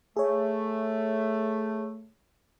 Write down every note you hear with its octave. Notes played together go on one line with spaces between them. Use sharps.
A3 G#4 C#5